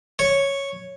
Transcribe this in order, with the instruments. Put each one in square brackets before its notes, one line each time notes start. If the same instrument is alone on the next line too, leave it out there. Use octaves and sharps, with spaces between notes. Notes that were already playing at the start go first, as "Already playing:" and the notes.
[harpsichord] C#5